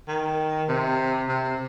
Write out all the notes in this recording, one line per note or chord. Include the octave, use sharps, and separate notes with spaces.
D#3
C3
C3